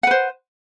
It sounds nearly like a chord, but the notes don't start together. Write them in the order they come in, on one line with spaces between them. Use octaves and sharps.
F#5 B4 C5